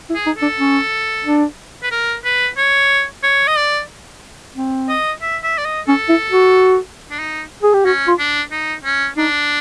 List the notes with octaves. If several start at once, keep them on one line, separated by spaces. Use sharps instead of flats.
E4
G#4
D#4
D4 A4
C#4
D4
B4
A#4
B4
C#5
C#5
D#5
D5
C4
D#5
E5
E5
D5
D#5
C#4 A4
E4
F#4
D4
D#4
G#4
G4
C#4 F#4
F4
D4
D#4
C#4
D4 D#4